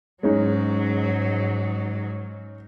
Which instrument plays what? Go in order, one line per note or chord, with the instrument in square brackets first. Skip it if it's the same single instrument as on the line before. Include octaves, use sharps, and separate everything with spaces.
[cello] G#2 F#3 [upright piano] G#3 C#4 D#4